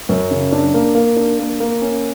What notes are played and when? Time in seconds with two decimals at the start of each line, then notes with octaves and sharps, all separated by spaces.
0.09 F#2
0.31 C#3
0.52 D4
0.74 A#3
0.95 A#3
1.16 D4
1.39 A#3
1.60 A#3
1.82 C#4